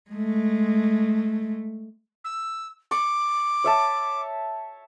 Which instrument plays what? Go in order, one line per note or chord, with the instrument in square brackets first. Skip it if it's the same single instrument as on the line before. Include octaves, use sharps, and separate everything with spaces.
[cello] G#3 A3
[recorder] E6
[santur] C#6 [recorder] D6
[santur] C#5 E5 A5